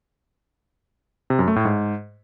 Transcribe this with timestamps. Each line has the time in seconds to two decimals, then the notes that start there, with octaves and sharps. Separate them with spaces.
1.30 C3
1.39 F#2
1.48 A3
1.56 A2
1.65 G#2